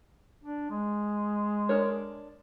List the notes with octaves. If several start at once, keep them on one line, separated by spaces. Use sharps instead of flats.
D4
G#3
D4 A#4 C#5